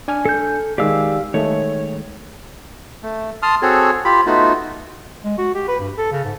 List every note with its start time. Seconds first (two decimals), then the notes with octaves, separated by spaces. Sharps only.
0.08 D4 G#5 F6
0.25 A4 G6
0.78 D#3 G#3 G4 D5 F5 E6
1.34 D#3 G#3 A3 C#5
3.03 A3
3.42 A5 C6 D#6 F6
3.62 C4 F#4 G#4 A4 C#5
4.05 F4 G4 B5
4.26 A3 B3 D#4 F4 F#4
5.24 G#3
5.38 F#4
5.54 G4
5.68 B4
5.80 G2
5.97 A4
6.12 C#3
6.24 G#2